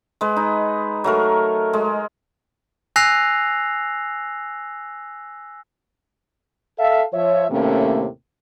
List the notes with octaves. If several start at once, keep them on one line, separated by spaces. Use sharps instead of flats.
G#3 B4
D#4
F#3 A3 A#4
G#3
G#5 E6 F#6 A#6 C7 F7
A4 E5 F5
F3 C#5 E5
D#2 A2 C3 A3 A#3 C#4